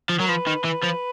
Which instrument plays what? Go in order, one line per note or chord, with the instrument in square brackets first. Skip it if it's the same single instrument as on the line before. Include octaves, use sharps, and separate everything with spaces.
[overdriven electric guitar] F3
[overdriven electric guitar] F#3 [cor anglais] A#4
[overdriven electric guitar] F3 [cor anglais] B4
[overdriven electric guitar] D#3
E3
F3